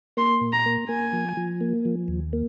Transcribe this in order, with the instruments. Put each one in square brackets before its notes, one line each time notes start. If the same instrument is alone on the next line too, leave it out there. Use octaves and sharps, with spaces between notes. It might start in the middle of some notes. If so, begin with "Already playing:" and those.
[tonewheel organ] A#3 [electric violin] C6
[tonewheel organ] A#2
[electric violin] A#5
[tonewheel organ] A#3
[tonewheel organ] A#3 [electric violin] G#5
[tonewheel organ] F3
F3
A#3
F3
D#2
A#3